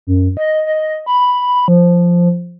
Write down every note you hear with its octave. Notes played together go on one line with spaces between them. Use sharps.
F#2
D#5
D#5
B5
F3